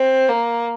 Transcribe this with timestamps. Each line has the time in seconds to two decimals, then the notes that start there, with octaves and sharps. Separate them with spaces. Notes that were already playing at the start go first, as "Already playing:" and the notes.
Already playing: C4
0.29 A#3